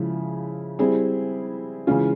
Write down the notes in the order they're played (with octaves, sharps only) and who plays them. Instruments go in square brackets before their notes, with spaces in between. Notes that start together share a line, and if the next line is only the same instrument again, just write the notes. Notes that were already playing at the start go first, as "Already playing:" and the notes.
Already playing: [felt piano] C#3 F3 G#3 E4
G3 C4 E4 G#4
C#3 E3 G#3 C#4 F4